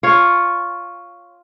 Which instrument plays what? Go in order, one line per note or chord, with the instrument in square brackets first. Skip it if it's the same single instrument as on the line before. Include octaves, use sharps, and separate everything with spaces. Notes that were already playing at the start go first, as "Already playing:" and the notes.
[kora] F4 C#5